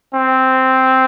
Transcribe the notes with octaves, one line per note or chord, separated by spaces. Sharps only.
C4